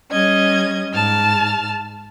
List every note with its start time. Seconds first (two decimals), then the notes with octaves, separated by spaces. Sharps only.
0.10 G3 C#4 D#5 G#6
0.93 G#2 A5 F6